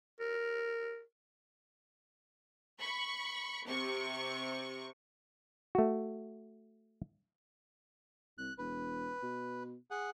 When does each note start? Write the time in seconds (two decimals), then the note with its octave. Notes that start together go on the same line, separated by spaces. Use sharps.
0.20 A#4
2.81 B5 C#6
3.67 C3 C#6
5.75 A3 F#4
8.38 C2 F#6
8.58 E1 B4
9.22 B2
9.91 G#4 F#5